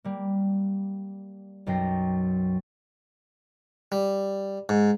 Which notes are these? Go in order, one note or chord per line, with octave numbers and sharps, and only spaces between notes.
G3 A#3
B1 F#2 F#3 G5 A#6 C7
G3
G#2